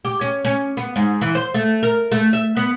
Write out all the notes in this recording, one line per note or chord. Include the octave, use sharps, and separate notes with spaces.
G4
C#4
C#4
B3
G#2
E3
C5
A3
A#4
A3
E5
B3